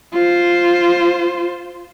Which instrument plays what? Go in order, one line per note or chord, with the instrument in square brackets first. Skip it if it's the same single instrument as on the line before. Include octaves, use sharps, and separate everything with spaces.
[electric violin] F4 C5